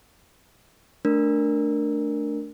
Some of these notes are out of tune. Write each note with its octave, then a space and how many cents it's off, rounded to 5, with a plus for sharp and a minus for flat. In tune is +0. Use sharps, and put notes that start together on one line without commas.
A3 +0 D4 -5 A#4 +0